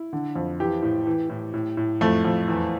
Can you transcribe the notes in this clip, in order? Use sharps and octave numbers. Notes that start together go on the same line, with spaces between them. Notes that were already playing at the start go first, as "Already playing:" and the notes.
Already playing: E4
D3
F2
E3 G4
A2
E3
A2
A2
A2
F2 A3
F2
E2